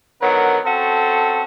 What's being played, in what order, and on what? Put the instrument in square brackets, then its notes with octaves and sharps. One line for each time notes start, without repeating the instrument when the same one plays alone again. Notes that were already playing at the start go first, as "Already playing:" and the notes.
[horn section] D3 D#3 F#3 B3 A#4
C4 C#4 F#4 A4